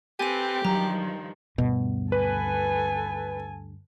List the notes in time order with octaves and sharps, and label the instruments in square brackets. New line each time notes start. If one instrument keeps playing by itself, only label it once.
[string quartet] C4 A4 B4 [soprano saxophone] G4 [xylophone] G#5 D#7
[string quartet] G2 D#3 F3 [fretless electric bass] F#3 [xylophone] A#5
[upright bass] D2 G2 [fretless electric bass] B2
[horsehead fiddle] A4 G#5 [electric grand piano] B4